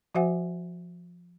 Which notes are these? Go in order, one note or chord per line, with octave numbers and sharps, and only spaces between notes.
F3 F#4 C5 E5 F#5 G#5